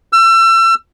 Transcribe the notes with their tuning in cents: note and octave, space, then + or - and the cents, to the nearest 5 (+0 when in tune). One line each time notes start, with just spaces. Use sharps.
E6 +35